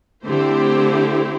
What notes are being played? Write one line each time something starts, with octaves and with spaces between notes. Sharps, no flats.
D3 A3 C4 E4 G4 C5